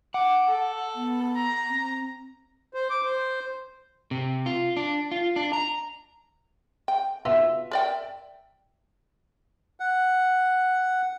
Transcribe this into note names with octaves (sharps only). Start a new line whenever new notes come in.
F#5 D6
A4
B3
A#5
C4
C5
D6
C5
C3
F4
D4
F4
D4
A#5
G5
B3 F4 F#4 E5
A#4 D5 G5
F#5